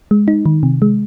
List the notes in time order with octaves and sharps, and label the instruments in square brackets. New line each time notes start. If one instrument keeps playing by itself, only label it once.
[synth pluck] G#3
D#4
D#3
C3
G#3